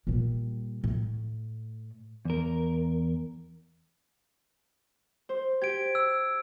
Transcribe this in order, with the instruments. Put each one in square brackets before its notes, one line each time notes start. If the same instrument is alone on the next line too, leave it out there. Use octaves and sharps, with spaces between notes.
[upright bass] A#2 G3
A2
[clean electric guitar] E2 A#4
[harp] C5
[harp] G4 [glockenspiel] G#6 D7
[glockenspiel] E6